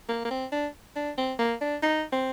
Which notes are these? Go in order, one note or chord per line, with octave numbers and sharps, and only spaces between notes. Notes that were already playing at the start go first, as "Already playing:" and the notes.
A#3
A#3
C4
D4
D4
C4
A#3
D4
D#4
C4